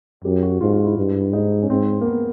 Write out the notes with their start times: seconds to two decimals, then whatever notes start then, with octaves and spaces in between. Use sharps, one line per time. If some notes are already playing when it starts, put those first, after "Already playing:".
0.24 F#2 G4
0.43 F#4
0.61 G#2 F4
0.73 F4
0.85 E4
0.97 G2
1.33 G#2 D#4
1.63 C#4
1.69 G#2 C4
2.01 A#3
2.06 B3